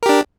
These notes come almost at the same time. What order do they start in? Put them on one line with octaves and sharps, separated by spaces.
A#4 G4 D4